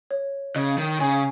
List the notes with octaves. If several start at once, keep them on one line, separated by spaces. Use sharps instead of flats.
C#5
C#3 D#5
D#3
C#3 G#5